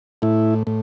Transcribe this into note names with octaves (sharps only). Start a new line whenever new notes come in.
A2 E4
A2